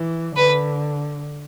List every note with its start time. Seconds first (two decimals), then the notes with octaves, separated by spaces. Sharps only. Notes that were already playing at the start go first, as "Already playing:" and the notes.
Already playing: E3
0.36 D3 B4